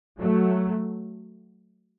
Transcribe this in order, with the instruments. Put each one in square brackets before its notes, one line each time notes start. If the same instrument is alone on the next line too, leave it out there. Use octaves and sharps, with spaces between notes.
[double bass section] F#3 A3